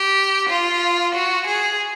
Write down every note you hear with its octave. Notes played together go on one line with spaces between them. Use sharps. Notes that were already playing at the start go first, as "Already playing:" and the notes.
Already playing: G4
F4
F#4
G#4